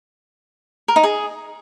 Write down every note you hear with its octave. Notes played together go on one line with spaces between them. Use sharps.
A#4
D#4
G#4